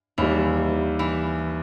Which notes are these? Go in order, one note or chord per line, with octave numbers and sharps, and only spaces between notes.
D#2 D#3 E3 G3
E3